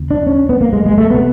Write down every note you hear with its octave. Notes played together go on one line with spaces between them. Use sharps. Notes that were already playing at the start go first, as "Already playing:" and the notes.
Already playing: D#2 C#3
D4
C#4
B3
A#3
G#3
G#3
A3
C3 B3